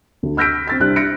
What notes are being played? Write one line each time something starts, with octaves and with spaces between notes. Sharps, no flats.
D2
E6 F6 G6 A#6 B6 D7
C4 A6 B6
C2 C4 D4 G4 F#6
A#6 C#7 D7